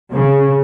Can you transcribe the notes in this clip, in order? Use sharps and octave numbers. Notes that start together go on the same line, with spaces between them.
C#3